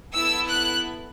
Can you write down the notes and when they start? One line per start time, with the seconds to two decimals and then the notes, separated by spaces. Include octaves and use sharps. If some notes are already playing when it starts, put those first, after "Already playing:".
0.13 B3 E4 A4 E6
0.50 F#6